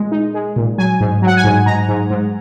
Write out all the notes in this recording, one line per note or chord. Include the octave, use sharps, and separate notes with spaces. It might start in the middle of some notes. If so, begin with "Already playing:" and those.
Already playing: A#2 G#3
D#4
G#3
A#2
F#3 G#5
G#2
F#3 F#5
G#5
G#2
G#2 A#5
G#2
G#2